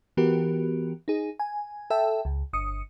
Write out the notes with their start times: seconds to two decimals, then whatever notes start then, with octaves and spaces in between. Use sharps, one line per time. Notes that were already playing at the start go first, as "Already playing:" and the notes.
0.17 E3 B3 F#4 G4 A#4
1.08 D#4 G#4
1.39 G#5
1.90 A4 E5 G5 A5
2.25 C#2
2.53 G1 D#6 C#7